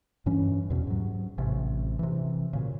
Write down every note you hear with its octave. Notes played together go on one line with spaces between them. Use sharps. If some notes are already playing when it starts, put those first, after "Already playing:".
G2 E3 C#4
E2 B2
G#2 F#3
A1 C3
C3 E3
A#2 C#3